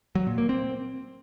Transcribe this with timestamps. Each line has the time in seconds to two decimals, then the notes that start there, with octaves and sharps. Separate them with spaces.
0.15 F#3
0.27 A#2
0.38 A#3
0.49 C4